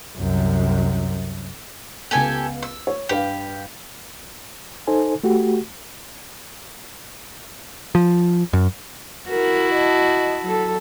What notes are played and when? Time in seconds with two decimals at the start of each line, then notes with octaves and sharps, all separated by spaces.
0.17 C2 F#2
2.11 C#2 B3 G4 A4 G#5
2.63 E6
2.87 C#5
3.09 G2 G4 B4 F5
4.87 D#4 A4 C5 G#5
5.24 A3 F#4 G4
7.95 F3
8.53 F#2
9.29 E4 F#4 A#4
9.74 D#5 A5
10.43 F#3 A4